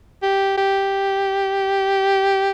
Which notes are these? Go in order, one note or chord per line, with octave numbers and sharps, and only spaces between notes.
G4
G4